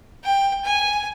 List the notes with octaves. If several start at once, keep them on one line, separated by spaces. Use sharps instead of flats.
G5
G#5